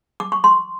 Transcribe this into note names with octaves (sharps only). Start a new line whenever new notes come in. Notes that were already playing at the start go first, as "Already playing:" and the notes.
D6
C#6
C6